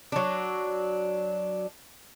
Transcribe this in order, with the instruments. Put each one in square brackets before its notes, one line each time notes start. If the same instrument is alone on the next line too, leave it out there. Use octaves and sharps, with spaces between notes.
[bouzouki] F#3 D4